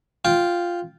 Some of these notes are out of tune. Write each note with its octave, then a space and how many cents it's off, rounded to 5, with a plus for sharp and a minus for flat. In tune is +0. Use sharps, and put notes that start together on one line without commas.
F4 +0 G5 +0